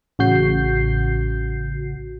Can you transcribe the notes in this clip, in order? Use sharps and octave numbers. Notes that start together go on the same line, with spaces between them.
A1 C#3 F#4 G6 C7